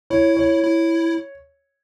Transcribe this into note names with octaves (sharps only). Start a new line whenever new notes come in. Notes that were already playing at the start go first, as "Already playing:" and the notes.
E4 C#5
C#5
E4